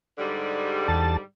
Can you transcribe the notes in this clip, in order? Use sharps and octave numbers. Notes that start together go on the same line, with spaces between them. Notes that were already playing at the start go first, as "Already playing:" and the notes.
G#2 D3 G3
E2 A5